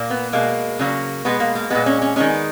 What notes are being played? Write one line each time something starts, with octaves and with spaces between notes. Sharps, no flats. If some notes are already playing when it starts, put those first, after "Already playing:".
Already playing: A#2 A#3
B3
B2 G#3 A#3
C#3 F#3 A#3
B2 G#3 B3
A#3
A#3
A#2 G#3 B3
C#4
C#4
D#3 G#3 C#4
B3